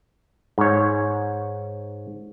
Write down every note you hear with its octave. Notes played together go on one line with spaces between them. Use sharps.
G#2 C#5